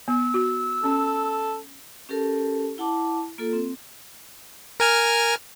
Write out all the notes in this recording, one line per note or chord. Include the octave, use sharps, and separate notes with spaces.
B3 E6
F#4
C#4 A4
C#4 G4 A4 A#4 A5
E4 F#5 A5 D6
A#3 F4 A4
C4
A#4 G#5 F6